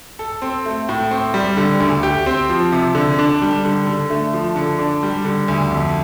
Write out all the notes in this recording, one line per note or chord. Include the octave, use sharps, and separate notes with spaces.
A4
C4
A3
A2
C4
G3
D3
D2
G4
C4
F3
C3
D3
D4
G3
D3
D3
A3
F3
D3
D4
G3
D3
D2
F2